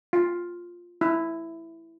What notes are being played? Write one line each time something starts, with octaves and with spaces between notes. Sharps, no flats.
F4
E4